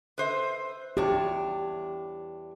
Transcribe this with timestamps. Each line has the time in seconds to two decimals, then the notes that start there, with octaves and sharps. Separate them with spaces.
0.18 B4 C5 E5
0.97 E2 D4 G4 C#5